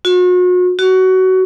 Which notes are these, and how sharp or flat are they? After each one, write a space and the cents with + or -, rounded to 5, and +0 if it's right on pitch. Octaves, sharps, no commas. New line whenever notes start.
F#4 -40
F#4 +20